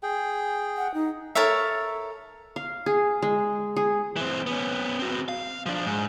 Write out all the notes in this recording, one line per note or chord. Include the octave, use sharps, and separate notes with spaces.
G#4 G5
F#5
D#4
A4 A#4 C#5 E5
F5
G#4
G#3
G#4
E3 C4
B3 C#4
C4 F#4
F5
F3 D4
G#2